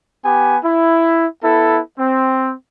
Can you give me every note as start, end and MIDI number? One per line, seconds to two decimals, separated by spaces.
0.25 0.57 59
0.25 0.57 67
0.25 0.57 80
0.64 1.26 64
1.44 1.80 59
1.44 1.80 64
1.44 1.80 69
1.99 2.54 60